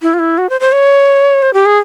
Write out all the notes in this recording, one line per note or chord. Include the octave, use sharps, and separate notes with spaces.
E4
F4
E4
F#4
C5
C5
C#5
C5
G4
G#4